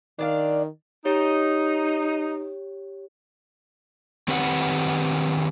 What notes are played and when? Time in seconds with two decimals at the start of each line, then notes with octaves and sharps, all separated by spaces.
0.19 D#3 D4 D5 F5
1.05 D#4 G4 C#5
4.28 D#3 C4 G4 B4 C#5 F#5